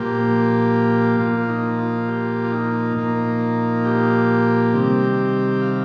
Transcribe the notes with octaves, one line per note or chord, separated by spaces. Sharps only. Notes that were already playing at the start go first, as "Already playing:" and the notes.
Already playing: A#2 F3 A#3 G4
A#2 F3 A#3 F4
D#4
F4
G4
F4
D#4
A#2 F3 A#3
G4
C3 D#3 G3 C4
F5